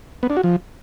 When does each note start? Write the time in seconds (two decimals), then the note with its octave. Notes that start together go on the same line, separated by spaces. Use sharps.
0.23 B3
0.30 D4
0.37 F#4
0.43 F3